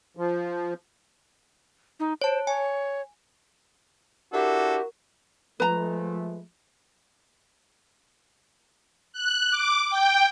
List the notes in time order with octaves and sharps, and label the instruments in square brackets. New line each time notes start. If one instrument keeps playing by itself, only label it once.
[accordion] F3
[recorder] D#4
[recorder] C5 [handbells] C#5 A5
[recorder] C#5 [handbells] G#5
[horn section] D4 E4 A4 [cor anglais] F#4 [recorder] G4 [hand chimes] A#4
[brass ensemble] F3 G#3 A3 [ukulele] B4 A#5
[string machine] F#6
D6
G5